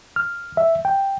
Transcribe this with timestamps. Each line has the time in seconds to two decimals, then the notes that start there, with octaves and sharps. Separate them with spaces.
0.16 F6
0.57 E5
0.85 G5